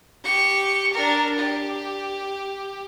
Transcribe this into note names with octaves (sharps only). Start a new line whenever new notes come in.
G4 C#6
D4 A#4
G4